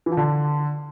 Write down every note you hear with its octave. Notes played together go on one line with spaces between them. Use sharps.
E3
F3
D3